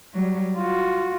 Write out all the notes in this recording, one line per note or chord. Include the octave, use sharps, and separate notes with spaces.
F#3 G3
F4 F#4